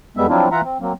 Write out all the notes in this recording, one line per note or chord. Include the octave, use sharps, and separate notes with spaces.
F2 G3 G#3 B3 E5
F3 F#3 C4 D4 E4 F4
E3 F4 E5 F#5 A#5
C4
F#3 A#3 C4